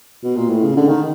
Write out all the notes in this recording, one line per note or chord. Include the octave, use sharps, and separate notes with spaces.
B2
A#2
A2
C#3
D3
D#3